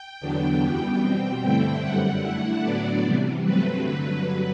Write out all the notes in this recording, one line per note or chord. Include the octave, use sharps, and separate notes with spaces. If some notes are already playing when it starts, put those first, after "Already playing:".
Already playing: G5
E2 D3 F#3 B3 D4
F#2 E3 G3 B3 G5
B2 G3 C4 G5
G2 D3 A3 C4 E4
F#2 D3 G3 F#5
D3 A3 E4 F#5
A2 F#3 B3 D4 D5
C3 E3 G3
G2 F#3 A3 C4 B4
G2 D3 F#3